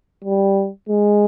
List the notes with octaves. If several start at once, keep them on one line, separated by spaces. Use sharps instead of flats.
G3
G#3